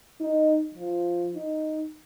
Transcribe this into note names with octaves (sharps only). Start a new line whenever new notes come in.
D#4
F3
D#4